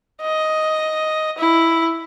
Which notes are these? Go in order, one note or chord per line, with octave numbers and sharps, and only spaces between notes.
D#5
E4